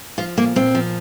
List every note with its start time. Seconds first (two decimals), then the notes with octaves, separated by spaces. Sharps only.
0.18 F3 F4
0.37 A#2 A#3
0.56 A#2 C4
0.75 F3